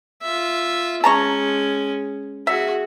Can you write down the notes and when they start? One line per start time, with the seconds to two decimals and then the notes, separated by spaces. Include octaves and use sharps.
0.23 F4 E5
1.04 G#3 C#4 A5 A#5 C#6
2.47 F#4 G#4 E5